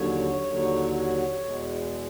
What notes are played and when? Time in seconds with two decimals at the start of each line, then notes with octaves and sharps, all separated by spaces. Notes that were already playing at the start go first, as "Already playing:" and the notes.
Already playing: D#2 D3 F#3 C#5
0.47 D#2 D3 F#3
1.42 E2 B2 G#3